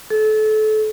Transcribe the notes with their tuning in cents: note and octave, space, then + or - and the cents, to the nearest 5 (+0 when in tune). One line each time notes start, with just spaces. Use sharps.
A4 -30